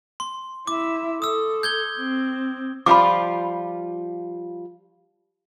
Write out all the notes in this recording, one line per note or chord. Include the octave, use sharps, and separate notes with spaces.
C6
E4 E5 D6
A4 D#6 E6
G6 G#6 G7
C4
F3 G3 F4 B5 D6